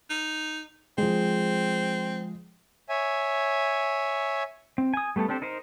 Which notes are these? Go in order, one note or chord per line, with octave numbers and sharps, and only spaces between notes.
D#4
F3 G#3 C4
C#5 E5 G#5
C4
G#5 D#6
G3 A3 B3 G4 A4
C4 D4 G4 A4 C5
D#4 A#4 C5